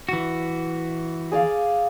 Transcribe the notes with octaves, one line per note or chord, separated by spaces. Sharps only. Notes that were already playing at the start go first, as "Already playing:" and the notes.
E3 F#4
G#4 D5 F5